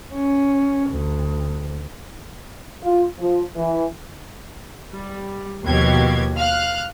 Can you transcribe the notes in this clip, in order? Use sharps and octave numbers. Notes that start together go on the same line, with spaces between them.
C#4
D2
F4
F3
E3
G3
D#2 B2 F3 F#4 G4 G#6
F5 F6 F#6